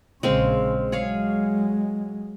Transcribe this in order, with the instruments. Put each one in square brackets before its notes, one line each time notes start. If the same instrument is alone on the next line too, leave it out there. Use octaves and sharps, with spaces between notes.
[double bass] A#1 C#3 [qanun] G#3 C4 F5
[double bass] F#3 G#3 [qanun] G#4 C#5 F5